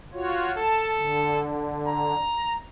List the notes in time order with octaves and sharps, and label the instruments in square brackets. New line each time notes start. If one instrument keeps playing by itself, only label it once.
[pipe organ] F4 F#4 C#5
[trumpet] A4 [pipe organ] A5
[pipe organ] D3
[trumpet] A#5